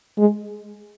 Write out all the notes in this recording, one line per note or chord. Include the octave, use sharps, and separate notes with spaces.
G#3